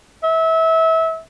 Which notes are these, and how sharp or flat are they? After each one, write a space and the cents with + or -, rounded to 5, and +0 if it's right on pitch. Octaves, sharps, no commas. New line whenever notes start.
E5 -25